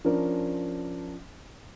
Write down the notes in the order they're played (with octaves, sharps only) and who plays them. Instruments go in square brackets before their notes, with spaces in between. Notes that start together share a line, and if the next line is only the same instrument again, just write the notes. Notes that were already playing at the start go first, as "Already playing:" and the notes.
[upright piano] F3 C#4 D4 A#4